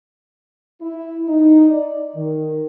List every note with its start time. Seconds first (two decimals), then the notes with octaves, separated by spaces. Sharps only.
0.82 E4
1.28 D#4
1.70 D5
2.16 D#3